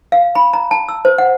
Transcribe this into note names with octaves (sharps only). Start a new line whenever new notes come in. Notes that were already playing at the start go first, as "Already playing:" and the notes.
F5
B5
A#5
A5
E6
C5
F#5